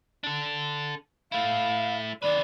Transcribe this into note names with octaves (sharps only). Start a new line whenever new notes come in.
D4 A4
A3 E4 F5
D#3 B4 D5